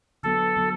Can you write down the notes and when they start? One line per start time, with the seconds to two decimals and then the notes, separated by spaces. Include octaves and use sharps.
0.23 D3 F#3 B3 A4
0.56 D3 F#3 B3